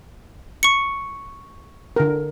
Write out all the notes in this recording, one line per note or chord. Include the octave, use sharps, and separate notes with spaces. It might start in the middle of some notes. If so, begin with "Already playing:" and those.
C#6 C#7
D3 A#4